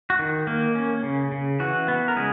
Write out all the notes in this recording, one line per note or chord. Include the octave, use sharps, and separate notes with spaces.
F#4
D#3
A#3
C#4
C#3
C#3
E3 F#4
B3
A#4
C#3 G#3 G#4